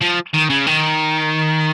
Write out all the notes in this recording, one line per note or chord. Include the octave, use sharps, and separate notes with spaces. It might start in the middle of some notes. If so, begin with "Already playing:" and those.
F3
D#3
C#3
D#3